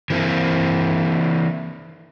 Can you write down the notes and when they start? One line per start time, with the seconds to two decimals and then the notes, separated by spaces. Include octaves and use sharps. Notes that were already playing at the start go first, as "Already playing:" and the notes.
0.10 E3 A#3 C4